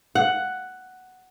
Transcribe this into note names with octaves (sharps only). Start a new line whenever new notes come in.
F#5